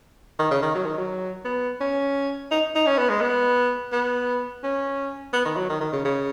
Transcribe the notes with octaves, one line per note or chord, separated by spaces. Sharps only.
D#3
C#3
D#3
F#3
D#3
F#3
B3
C#4
D#4
D#4
C#4
B3
G#3
B3
B3
C#4
B3
D#3
F#3
D#3
D#3
C#3
C#3